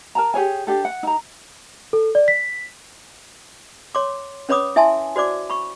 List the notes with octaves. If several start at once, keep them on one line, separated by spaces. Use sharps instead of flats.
A#4 A5 A#5
G4 G#4 C#5 G#5
D4 G4 A4
F#5
D#4 A#5
A4
D5
B6
C#5 C6 D6
C#4 B4 C#5 B5 D6 D#6
E4 E5 G#5 A5 C6
F#4 C5 D5 D6
B5 C#6